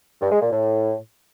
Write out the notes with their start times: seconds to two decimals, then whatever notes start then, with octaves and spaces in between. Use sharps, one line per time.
0.21 G2
0.31 G#3
0.41 A#2
0.51 A2